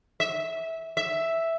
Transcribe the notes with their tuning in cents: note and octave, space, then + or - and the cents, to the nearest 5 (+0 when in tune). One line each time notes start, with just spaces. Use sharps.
E5 -15
E5 +0